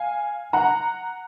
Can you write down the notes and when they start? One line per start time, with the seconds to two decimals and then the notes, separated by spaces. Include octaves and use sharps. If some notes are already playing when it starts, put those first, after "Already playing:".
Already playing: F5 G#5
0.53 F#5 A#5